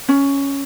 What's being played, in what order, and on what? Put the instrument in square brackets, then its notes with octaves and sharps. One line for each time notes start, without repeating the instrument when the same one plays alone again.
[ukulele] C#4